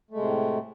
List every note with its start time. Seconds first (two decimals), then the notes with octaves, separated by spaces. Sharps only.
0.11 A3
0.13 G#3
0.16 C3
0.19 A2